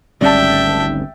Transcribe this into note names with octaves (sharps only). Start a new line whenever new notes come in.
G#1 D2 G3 C#4 D5 E5 G5 A5